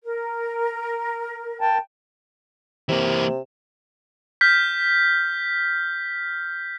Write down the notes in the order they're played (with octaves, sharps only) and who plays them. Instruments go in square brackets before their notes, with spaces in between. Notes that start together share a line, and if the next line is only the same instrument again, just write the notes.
[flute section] A#4
[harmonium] G5 A5
[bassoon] C3 [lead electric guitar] E3 A#3
[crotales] F6 G6 B6